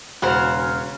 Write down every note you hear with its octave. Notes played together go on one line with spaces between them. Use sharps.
E1 C#3 C#4 F#4 C5 A#5